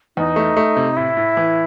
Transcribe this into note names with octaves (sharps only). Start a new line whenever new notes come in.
E2 D#4
A3
A3
C3
A2 E4
A2
E3